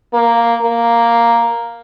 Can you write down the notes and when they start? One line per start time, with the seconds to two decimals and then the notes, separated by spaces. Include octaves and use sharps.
0.13 A#3
0.62 A#3